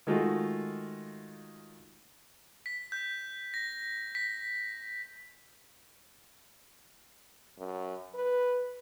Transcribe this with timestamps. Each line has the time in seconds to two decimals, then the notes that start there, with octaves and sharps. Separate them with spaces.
0.07 D#3 G#3 A3 F4 F#4
2.66 B6
2.92 G6
3.54 A#6
4.15 B6
7.59 F#2
8.14 B4